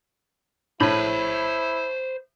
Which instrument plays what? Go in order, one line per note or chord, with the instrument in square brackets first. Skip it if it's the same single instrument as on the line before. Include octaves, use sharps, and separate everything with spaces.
[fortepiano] A2 [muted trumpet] E4 [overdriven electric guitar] C5 B5